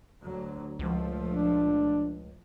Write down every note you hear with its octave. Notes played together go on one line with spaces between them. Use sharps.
D2 F#3
C#2 A#2 F3 A3
D4